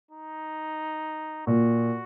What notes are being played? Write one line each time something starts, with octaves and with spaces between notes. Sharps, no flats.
D#4
A#2 F#4